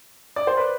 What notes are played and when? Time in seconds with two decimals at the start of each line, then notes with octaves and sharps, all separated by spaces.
0.36 D5
0.47 C5
0.57 B4 D5